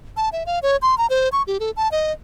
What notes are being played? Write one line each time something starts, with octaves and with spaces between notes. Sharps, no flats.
A5
E5
F5
C#5
C6
A#5
C5
C#6
G4
A4
A5
D#5